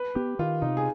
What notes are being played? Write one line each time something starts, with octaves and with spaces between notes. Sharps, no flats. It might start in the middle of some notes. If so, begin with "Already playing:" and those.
Already playing: B4
B3 G4
D#3 F4
C3 D#4
G#4